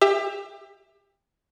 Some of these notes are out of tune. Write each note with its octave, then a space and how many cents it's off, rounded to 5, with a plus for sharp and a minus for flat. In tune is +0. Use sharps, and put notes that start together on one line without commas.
G4 +30 E5 +0